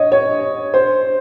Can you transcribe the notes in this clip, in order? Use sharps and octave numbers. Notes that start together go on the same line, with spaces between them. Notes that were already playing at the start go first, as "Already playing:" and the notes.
Already playing: C#5 D#5
C#5
C5